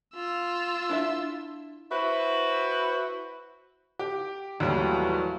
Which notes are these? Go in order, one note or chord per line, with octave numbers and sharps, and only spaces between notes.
F4 E6
D4 E4 E5
E4 F#4 B4 C5 E5
G4
D#2 A2 E3 F#3 G3